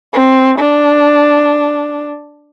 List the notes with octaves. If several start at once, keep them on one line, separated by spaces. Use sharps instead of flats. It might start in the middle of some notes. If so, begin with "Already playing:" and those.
C4
D4